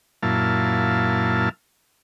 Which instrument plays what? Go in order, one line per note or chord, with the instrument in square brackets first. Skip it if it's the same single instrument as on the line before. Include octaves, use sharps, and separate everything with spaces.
[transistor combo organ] F#2 A#2 E4 F5 A5